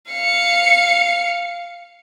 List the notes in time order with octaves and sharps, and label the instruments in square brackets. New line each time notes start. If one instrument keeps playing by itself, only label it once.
[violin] F5 C#7